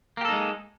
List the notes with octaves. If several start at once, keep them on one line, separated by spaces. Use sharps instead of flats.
G#3 A#3 D#4 G4 A4